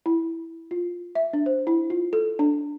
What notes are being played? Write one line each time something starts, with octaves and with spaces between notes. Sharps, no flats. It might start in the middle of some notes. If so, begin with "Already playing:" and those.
E4
F4
E5
D4
C5
E4
F4
A4
D4